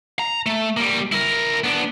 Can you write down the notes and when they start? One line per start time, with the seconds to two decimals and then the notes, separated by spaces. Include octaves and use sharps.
0.19 A#5
0.46 A3
0.77 G3 A#3
1.12 E4 A#4
1.64 B3 D4